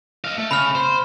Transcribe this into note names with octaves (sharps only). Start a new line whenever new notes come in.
D#5 F5
A3
C#3 B5 F6
C5